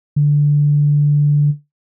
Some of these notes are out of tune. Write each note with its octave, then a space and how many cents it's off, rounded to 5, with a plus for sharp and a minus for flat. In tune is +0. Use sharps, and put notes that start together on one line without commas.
D3 -5